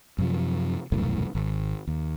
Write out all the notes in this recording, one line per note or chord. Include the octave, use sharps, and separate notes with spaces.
F#2 C3 F3
E1 C2 F#2 A2
G#1
D#2